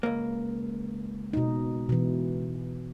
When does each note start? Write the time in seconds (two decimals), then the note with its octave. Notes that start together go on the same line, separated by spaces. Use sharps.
0.03 C#2 A#3
1.33 B2 D#4
1.89 B2 E3